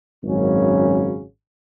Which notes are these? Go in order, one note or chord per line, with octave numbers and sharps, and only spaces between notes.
G#1 F#2 C#3 F#3 C#4